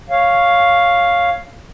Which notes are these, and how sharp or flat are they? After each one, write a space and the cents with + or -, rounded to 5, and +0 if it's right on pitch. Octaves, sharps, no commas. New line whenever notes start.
C#5 +0 F5 +0